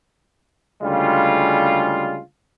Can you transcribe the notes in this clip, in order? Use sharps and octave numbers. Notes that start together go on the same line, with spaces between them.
D2 C#3 G3 G#3 F4